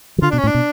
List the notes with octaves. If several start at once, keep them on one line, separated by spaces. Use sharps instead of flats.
F3
D3 F4
B2 D4
C#4
A2
D4
B2